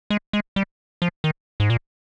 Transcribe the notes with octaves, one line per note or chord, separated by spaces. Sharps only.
G#3
G#3
G3
F3
D#3
G#2
A#2